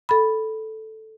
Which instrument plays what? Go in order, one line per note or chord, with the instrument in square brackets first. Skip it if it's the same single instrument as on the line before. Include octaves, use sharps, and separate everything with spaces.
[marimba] A4 B5